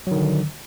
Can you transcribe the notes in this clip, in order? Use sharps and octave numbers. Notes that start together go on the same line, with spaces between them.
D3 D#3 F#3